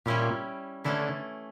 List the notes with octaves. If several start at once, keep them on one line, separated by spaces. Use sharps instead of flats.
A#2 G3 C#4 E4 G4
D3 E3 A3 C#4 E4 A4